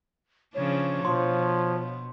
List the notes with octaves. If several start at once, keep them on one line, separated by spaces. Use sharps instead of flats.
C#3 F3 D4 C#5
B2 F3 C6